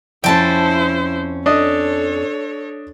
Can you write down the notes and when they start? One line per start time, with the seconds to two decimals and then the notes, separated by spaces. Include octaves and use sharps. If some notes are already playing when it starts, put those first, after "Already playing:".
0.24 F2 C#4 E4 C5 G5 A5
1.46 D4 A4 C#5 D#5